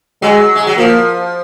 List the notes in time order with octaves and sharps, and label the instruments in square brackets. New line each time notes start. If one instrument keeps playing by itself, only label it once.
[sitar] F#3 [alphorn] G#3
[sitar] G#3
F#3
[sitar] F3 [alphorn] A#3